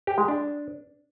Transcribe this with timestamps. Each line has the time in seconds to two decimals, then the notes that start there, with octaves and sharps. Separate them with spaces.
0.07 G4
0.18 G#3
0.28 D4